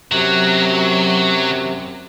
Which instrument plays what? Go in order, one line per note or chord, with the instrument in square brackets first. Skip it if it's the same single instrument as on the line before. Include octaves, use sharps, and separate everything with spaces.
[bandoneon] F#2 C3 [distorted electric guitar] F#3